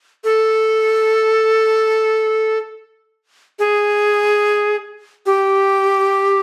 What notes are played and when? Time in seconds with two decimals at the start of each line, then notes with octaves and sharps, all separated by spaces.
0.24 A4
3.59 G#4
5.26 G4